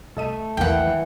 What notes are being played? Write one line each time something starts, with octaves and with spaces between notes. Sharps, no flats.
C2 A3 A4 D#5 D#7
B1 E2 E3 A#3 F#5 G5